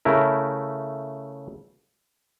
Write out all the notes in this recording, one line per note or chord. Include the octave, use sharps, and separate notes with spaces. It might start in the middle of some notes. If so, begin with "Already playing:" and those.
C#3 A3 E4 A#4